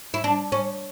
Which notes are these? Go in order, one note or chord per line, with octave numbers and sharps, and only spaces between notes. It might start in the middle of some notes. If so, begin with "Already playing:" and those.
E4
D4
C#4